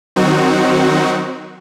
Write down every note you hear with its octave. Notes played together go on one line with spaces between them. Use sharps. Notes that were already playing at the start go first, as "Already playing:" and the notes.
D#3 F#3 C4 D#4 F#4